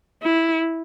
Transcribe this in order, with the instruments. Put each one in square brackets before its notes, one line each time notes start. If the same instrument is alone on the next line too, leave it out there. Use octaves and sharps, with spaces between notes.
[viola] E4